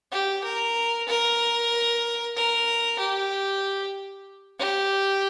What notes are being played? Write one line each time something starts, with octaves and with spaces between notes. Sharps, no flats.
G4
A#4
A#4
A#4
G4
G4